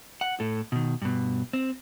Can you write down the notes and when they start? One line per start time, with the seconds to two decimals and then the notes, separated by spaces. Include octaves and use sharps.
0.21 F#5
0.40 A2 A4
0.72 B2 D#3
1.02 G2 B2
1.53 C4